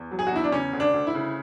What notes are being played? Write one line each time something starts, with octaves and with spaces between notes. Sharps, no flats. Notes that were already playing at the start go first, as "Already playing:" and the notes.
Already playing: E2
F#3
G#4
F#4
E2 E4
D4
C#3 C#4
D2
D4
D2
E4
C#3